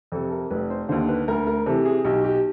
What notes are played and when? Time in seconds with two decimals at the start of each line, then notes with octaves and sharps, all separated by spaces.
0.12 F2 C3 A4
0.31 A#4
0.50 F1 B4
0.70 C5
0.89 D#2 D3 C5
1.08 B4
1.28 D2 A#4
1.47 A#4
1.66 C3 E3 A4
1.85 G#4
2.05 B1 G4
2.24 G4